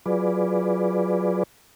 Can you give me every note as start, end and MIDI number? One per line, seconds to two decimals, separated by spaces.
0.06 1.43 54
0.06 1.43 65
0.06 1.43 68
0.06 1.43 71
0.06 1.43 74